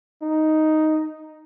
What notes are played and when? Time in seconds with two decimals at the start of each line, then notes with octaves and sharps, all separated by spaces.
0.23 D#4